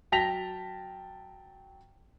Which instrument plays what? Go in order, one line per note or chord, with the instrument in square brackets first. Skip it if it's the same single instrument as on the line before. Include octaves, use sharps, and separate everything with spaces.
[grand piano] F#3 G5 A5 A#6 B6 F7